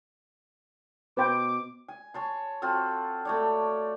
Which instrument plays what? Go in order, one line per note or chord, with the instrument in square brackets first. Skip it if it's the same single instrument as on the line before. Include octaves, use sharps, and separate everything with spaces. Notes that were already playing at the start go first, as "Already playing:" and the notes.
[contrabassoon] B2 [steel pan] B4 C5 G5 [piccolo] D6
[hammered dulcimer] G#5
C#5 A5 C6
C4 F4 F#4 A4
A3 C#5 D5